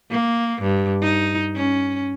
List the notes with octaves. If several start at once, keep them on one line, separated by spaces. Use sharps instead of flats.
A#3
G2
D#4
C#4